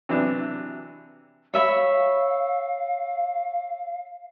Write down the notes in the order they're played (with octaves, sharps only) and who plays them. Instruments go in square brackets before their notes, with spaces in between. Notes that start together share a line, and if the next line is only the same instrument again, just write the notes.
[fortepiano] C3 E3 F#3 B3 D4
[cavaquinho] C#5 E5 B5 [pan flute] F5